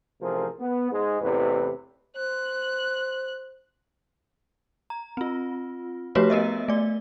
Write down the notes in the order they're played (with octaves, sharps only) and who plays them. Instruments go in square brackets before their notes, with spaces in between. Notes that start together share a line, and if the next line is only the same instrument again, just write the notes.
[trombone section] A1 C3 F3 G#4 A#4 C5
B3
G#2 G#3
A1 E2 C3 B4
[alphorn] C5 [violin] F#6
[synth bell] A#5
C4 F4
F3 A3 F#4 G4 B4 C#5
B3 A#4 D#5 E5
A3 D5